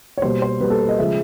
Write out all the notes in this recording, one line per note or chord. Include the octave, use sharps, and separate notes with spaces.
C#5
B2 G3 A#3 C5
C5
B2 G3 A#3 B4
A4
B4
D#5
C#3 F3 G#3 E5